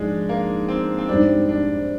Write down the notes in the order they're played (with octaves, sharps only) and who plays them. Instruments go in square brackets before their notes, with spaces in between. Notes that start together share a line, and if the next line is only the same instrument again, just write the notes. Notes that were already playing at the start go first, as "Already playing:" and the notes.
Already playing: [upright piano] G#2 F3 [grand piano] G#3 D4
[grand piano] A#3
C4
C4
[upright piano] G#2 G3 C4 [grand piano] D4
[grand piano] D4